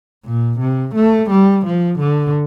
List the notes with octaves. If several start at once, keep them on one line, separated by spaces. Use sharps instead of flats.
A#2
C3
A3
G3
F3
D3